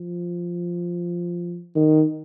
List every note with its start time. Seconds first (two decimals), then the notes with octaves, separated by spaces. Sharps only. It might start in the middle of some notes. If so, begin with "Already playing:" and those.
Already playing: F3
1.76 D#3